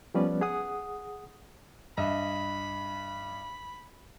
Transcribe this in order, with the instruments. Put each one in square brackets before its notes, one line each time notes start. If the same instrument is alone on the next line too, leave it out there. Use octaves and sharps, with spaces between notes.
[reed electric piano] F3 G3 B3 C#4 B4 D5
G#4 F#5 D#6
[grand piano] G2 D#5 E5 [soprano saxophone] B5